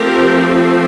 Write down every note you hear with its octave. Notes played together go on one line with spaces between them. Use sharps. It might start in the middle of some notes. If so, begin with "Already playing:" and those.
Already playing: F3 A3 C4 G4 A#4